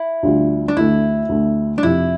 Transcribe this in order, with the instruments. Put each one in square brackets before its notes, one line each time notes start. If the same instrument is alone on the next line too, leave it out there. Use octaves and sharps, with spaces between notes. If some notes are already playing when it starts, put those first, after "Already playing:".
Already playing: [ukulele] E4
[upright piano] D2 D3 G3 D4 F4
[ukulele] D4
[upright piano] D2 D3 A3 [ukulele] E4
[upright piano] D2 D3 A3
[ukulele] D4
[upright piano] F2 C3 F3 [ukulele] E4